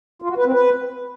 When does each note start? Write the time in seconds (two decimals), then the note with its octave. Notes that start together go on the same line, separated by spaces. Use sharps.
0.22 F4
0.30 F#4
0.37 B4
0.45 C4
0.53 B4